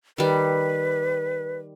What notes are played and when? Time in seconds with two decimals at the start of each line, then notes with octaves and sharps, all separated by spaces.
0.18 D#3 G3 B4